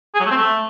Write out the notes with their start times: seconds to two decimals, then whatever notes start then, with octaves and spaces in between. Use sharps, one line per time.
0.15 G#4
0.20 F#3
0.25 A3
0.31 C4
0.36 A3